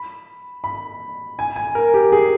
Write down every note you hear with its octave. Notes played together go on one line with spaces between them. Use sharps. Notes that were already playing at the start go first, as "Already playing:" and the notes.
Already playing: B5
B5
G#5
G#5
A#4
G4
G#4